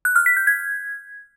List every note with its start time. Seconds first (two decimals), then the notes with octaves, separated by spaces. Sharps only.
0.05 F#6
0.16 F6
0.26 B6
0.37 G6
0.47 G#6